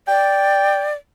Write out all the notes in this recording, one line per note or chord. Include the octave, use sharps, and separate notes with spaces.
D5 G5